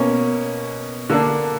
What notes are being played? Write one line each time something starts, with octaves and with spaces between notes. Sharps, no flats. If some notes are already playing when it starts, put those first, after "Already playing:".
Already playing: B2 A#3 C#4
D3 A#3 D4